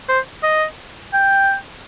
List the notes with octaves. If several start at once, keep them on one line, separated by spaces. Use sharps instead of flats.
C5
D#5
G5